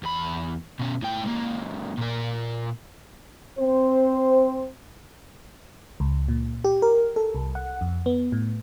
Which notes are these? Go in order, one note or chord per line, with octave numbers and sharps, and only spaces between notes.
E2 B5
B2 C#4
A2 G5
C#2 A#3
A#2 A#4
C4 C5
C#2
A#2
G4
A#4
A4
C2
F#5
F2
B3
A2